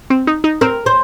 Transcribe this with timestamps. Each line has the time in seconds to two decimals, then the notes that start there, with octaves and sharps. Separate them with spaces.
0.10 C4
0.27 D#4
0.44 D#4
0.61 C4 A#4
0.86 C5